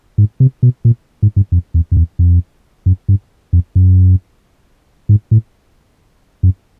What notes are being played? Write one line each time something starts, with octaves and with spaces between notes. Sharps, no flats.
G#2
C3
B2
A#2
G#2
G2
F2
E2
F2
E2
F2
F#2
G2
F2
F#2
G#2
A2
F#2